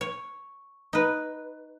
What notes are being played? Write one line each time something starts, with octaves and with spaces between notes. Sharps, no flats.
C#5
D#4 B4